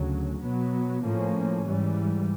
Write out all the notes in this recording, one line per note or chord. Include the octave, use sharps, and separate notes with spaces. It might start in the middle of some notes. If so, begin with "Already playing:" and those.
Already playing: D2 C#3 F#3
B2 F#3 B3
A2 F3 A#3 C#4
G#2 E3 G3